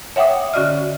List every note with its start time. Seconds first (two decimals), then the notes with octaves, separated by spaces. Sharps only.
0.16 C#5 E5 F#5 G5 D6 D#6
0.53 D3 C#4 F#4 D5 D#5 F6